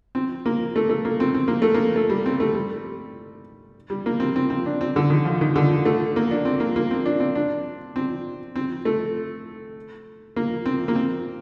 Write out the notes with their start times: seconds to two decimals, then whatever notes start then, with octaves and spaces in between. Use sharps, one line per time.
0.15 C4
0.46 A#3
0.76 A3
0.89 A3
1.05 A#3
1.20 C4
1.34 C4
1.48 A#3
1.62 A3
1.74 A#3
1.96 A3
2.10 G3
2.26 C4
2.40 A3
2.55 G3
3.90 G3
4.06 A#3
4.20 C4
4.36 C4
4.50 C4
4.66 D4
4.81 C4
4.96 D3
5.10 D#3
5.25 F3
5.41 D#3
5.56 D3
5.85 A3
6.16 A#3
6.31 D4
6.45 C4
6.60 A#3
6.76 A#3
6.91 C4
7.06 D4
7.20 C4
7.35 D4
7.96 C4
8.56 C4
8.85 A3
10.36 A#3
10.66 C4
10.88 A#3
10.96 C4